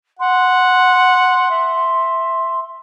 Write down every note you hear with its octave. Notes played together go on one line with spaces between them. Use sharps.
F#5 C6
E5